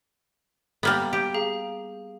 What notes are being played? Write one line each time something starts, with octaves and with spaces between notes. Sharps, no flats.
G3 A#3 B3
G4
G#4 F5 A#5